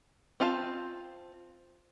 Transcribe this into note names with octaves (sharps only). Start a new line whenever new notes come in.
C4 F4 F5 A5